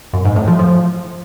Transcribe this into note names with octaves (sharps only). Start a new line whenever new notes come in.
F#2
G#2
A2
F3
F3